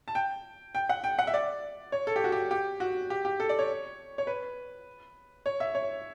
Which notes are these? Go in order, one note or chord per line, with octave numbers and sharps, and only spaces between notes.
A5
G5
G5
F#5
G5
F#5
E5
D5
C#5
A4
G4
F#4
G4
G4
F#4
G4
G4
A4
D5
C#5
C#5
B4
C#5
E5
C#5